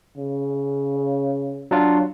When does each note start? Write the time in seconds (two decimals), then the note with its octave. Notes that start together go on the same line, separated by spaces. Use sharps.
0.18 C#3
1.71 F#3 D4 F4